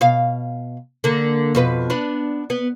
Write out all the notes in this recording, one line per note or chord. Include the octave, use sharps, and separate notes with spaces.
B2 F5
D3 A#3
F2 B2 B4
B3 D4
B3